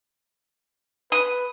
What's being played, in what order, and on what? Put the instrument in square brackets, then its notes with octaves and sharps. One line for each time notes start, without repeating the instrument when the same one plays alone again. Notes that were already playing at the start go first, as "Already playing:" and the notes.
[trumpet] B4 [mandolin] D#6